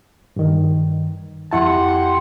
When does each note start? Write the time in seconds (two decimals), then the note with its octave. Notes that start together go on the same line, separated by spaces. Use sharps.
0.36 G2 D#3
1.51 F2 E4 G4 F#5 A5 C6